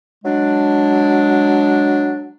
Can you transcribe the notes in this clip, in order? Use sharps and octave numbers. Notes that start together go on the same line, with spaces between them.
F#3 G#3 D4